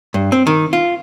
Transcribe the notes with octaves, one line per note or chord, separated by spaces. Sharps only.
G2
C4
D#3
F4